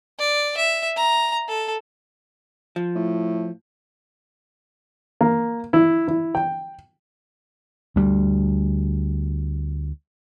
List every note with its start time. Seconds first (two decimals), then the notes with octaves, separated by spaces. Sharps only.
0.19 D5
0.57 E5
0.97 A#5
1.48 A4
2.76 F3
2.95 A2
5.21 A#3
5.73 E4
6.08 E4
6.35 G5
7.96 D2 G3